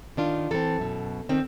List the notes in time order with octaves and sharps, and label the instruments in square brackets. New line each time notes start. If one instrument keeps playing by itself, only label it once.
[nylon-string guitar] D#3 D4 F4
[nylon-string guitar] E3 C4 [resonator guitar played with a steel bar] A4
[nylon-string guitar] F#2 B2
[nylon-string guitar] D#3 [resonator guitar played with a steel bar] C4